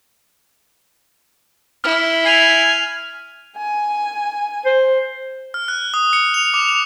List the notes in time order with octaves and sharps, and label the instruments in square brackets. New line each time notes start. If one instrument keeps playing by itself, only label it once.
[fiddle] E4 [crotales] F6
[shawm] G#5 [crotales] C7 D#7 F7
[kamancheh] G#5
[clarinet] C5
[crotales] F6
F#6
D#6
C#7
F7
D6
F7